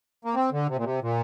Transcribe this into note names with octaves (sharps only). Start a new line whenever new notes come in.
A#3
C4
D3
C3
A#2
C3
A#2